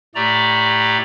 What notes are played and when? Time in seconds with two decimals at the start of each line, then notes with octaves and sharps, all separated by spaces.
0.15 A2 A3 G4 D5 A#5